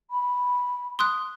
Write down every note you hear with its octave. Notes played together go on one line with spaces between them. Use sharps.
B5
C6 D#6 F#6